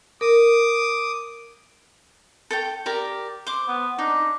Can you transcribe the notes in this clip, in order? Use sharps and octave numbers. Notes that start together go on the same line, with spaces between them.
A#4 D6 D#6
A4 C#5 G5
G4 A#4 D5
C5 D6
B3
D4 D#4